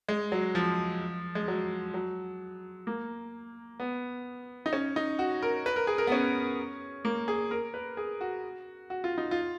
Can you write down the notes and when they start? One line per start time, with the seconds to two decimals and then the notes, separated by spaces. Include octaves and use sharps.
0.09 G#3
0.32 F#3
0.55 F3
1.35 G#3
1.48 F#3
1.94 F#3
2.87 A#3
3.80 B3
4.66 D#4
4.73 C#4
4.96 D#4
5.19 F#4
5.43 A#4
5.66 B4
5.76 A#4
5.87 G#4
5.98 A#4
6.07 B3
6.12 C#4
7.05 A#3
7.28 G#4
7.51 A#4
7.74 B4
7.97 G#4
8.21 F#4
8.90 F#4
9.04 F4
9.18 D#4
9.31 F4